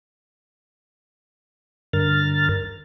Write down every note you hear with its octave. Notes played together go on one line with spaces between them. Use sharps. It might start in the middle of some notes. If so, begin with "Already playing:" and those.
G2 D3 A#4 F6 A6